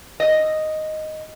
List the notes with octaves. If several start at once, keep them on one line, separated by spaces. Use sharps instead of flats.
D#5